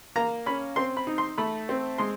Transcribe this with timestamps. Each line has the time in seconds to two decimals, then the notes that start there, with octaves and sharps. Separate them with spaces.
0.16 A#3 A#5
0.46 C#4 B5
0.76 C4 C6
0.97 B5
1.07 D#4
1.18 C6
1.38 A3 B5
1.69 C4
1.98 G#3 C6